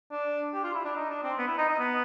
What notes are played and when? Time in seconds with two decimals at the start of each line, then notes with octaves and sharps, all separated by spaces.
0.11 D4
0.54 G4
0.64 F4
0.74 E4
0.85 D4
0.96 D#4
1.10 D4
1.23 C4
1.38 B3
1.47 E4
1.58 D#4
1.69 D#4
1.79 B3